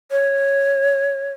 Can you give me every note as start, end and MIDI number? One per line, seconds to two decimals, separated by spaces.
0.11 1.32 73